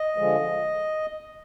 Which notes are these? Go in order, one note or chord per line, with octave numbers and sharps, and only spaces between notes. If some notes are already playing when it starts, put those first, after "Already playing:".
Already playing: D#5
D3 F3 G#3